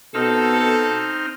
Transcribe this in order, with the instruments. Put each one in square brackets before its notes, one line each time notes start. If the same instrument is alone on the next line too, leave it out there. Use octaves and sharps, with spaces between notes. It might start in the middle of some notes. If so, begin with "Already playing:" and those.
[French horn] B2 [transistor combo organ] C4 D#4 F6 [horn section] A4